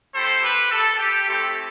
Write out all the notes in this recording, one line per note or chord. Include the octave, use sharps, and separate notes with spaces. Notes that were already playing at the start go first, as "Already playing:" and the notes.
A3 E4 G4 A4 C5
G4 B4
A4
G4
A3 C4 E4 G4 A4